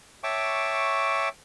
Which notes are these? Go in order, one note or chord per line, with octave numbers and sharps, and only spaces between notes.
C#5 E5 G5 A5 C#6 D6